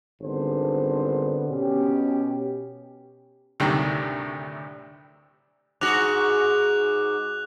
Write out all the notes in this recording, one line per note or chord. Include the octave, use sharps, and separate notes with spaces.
G#1 D3 G3 B3 D4 C5
B2 C#4 G4
D2 A2 C3 D#3 F#3 G3
G#2 F#4 D6 F#6 F7